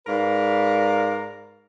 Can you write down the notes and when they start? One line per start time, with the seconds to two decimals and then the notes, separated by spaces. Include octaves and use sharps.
0.07 G#2 A#4 B4 D5 F5